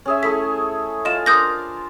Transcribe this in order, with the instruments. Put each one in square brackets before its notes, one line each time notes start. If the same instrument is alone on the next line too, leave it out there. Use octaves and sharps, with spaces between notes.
[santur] C#4 G#4 E5
[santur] A3 E4 G#4 [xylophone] B6
[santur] F4 [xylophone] D#5 E7
[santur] D4 A#4 C5 [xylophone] D#6 G6 A#6